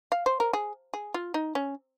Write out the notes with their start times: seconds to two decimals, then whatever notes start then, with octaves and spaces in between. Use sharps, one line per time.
0.12 F5
0.26 C5
0.40 A#4
0.53 G#4
0.94 G#4
1.14 F4
1.34 D#4
1.55 C#4